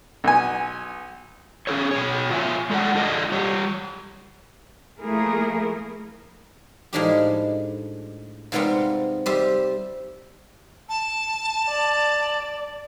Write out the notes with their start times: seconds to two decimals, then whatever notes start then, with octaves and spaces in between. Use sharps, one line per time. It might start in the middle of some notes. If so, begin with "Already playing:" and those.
0.24 B1 G#5
1.67 C#4 G#4 A4 C#5
1.91 B2 C#5
2.30 F4 C#5 E5 G#5
2.70 G#3 A4 C#5 D5 F#5
2.95 D4 F4 A4 C5 D5 D#5
3.32 G3 G4 C#5
4.99 F3 A3 A#3 E4 G#4 A#4
6.93 A2 F3 G#3 D4 D#4 G4
8.52 G#2 C3 G3 B3 C4 F4
9.26 G3 G4 C5 E5
10.89 A5
11.69 D5